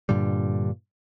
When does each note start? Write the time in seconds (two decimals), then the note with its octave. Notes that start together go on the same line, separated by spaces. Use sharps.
0.09 G2 A#2 D3 G3